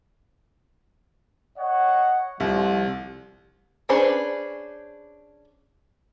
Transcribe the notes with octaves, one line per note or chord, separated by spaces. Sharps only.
C#5 D#5 F#5
C2 A2 C3 F3
C#4 D4 G#4 B4 C5